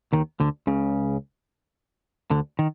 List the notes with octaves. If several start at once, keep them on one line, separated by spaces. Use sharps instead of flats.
D#2 D#3
D2 D3
C#2 C#3
D2 D3
D#3